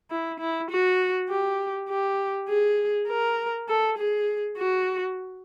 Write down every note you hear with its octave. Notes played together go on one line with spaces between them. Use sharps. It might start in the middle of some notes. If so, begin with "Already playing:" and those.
E4
E4
F#4
G4
G4
G#4
A#4
A4
G#4
F#4